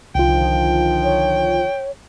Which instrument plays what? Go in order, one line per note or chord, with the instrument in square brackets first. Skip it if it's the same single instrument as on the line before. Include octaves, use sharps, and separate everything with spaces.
[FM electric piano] C2 F4 [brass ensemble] D3 D#3 F3 [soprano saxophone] G5
[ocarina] C#5